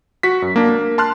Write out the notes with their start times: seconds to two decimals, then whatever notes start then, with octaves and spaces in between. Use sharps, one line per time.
0.23 F#4 B6
0.42 F#2
0.56 A#3 D4
0.69 A#3
0.98 A5 C6 F6 F#6